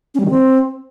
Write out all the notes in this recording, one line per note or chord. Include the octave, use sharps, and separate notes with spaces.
C#4
G3
D#3
C4